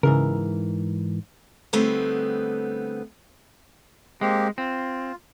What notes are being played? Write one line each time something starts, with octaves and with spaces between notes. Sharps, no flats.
G#2 C#3 E3 A#4
D3 G3 A3 B3 C4 D#4
G#3 A#3 C4 G4
C4 F4